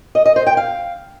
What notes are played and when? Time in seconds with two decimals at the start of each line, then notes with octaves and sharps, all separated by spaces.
0.15 D#5
0.26 D#5
0.36 C5
0.47 G5
0.57 F5